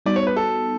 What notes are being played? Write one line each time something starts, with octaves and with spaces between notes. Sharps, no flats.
G3 B3 D#4 F#4 D5
C#5
B4
A4